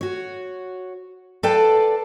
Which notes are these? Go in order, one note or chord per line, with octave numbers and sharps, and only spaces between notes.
F#4 C#5
A4 B4 D5 F5 G5 A5